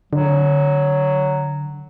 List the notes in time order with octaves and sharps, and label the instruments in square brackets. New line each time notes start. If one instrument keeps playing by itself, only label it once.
[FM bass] D3 [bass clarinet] F#3